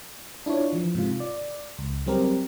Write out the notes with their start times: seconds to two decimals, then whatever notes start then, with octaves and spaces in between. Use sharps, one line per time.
0.46 D4 E4 F4 C#5
0.73 E3 F3
0.95 G#2 C3 F4
1.20 D5
1.79 C#2
2.06 F#3 G3 C4 G4 A#4